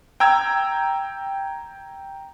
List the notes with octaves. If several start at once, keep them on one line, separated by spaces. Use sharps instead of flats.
G5 A#5 E6 G#6